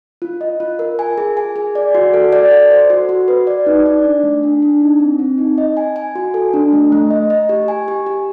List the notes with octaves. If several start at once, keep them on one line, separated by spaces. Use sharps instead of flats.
F4
D#5
F4
A#4
G#5
G#4
G#5
G#4
D5
F#4
A4
D5
A4
C5
F#4
F#4
B4
D5
D#4
D5
D4
A3
D4
D4
D#4
C4
C4
D#4
D#5
G#5
G#5
F#4
A4
D4
A3
A3
D#5
D#5
G4
G#5
G4
G4